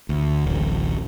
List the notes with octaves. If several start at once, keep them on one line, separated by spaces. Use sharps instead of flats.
D2
D1 A1